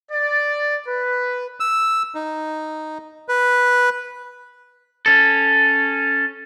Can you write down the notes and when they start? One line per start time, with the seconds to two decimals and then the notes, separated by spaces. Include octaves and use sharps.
0.12 D5
0.87 B4
1.60 E6
2.15 D#4
3.29 B4
5.06 C#4 A4